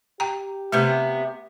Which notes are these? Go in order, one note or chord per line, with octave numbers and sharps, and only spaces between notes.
G4 G5 A#5
C3 A3 B3 B4 E5